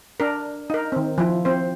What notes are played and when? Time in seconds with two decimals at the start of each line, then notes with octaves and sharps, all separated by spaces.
0.20 D4 A#4
0.70 D#4 A#4
0.92 D#3 C4
1.18 F3 E4
1.45 C4 C5